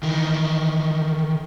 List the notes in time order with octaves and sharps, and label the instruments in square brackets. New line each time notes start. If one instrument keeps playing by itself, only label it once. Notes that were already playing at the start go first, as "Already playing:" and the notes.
[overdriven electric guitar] D#3 E3